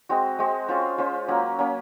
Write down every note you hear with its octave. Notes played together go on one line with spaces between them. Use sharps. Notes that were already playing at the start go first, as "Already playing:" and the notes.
G#3 C4 F#4
G#3 C4 F#4
C#4 F4 C5
C#4 F4 C5
F#3 A#3 C#4
F#3 A#3 C#4